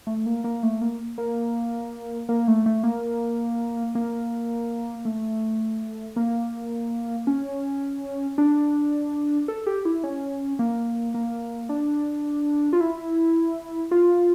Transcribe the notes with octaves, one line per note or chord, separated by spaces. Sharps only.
A3
A#3
A#3
A3
A#3
A#3
A#3
A3
A3
A#3
A#3
A3
A#3
C#4
D4
A4
G4
E4
C#4
A#3
A#3
D4
F4
E4
F4